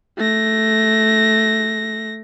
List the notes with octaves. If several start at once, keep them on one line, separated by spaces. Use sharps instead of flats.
A3 A#6